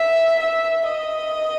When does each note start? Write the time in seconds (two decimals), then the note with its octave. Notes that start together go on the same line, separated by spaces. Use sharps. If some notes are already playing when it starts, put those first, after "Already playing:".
Already playing: E5
0.40 E5
0.86 D#5